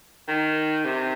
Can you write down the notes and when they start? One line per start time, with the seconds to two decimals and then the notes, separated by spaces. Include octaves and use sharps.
0.28 D#3
0.85 C3